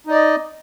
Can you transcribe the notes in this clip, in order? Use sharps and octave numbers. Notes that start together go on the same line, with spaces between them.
D#4 D5 D#5